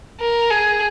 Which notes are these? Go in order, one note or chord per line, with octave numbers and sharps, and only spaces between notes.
A#4
G#4